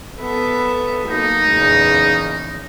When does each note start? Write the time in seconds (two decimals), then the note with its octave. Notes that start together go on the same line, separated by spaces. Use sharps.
0.19 B3 A4 E5
1.08 F#3 A#3 D#4
1.50 E2 A#2 C#3